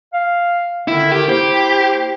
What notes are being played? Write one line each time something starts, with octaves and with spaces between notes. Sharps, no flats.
F5
D3 D#3 E4
G4
A#3 E4 G4 C5